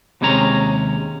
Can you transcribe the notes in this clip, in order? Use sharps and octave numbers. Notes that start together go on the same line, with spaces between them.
D#2 C3 G#3 C#4 C#5 A#5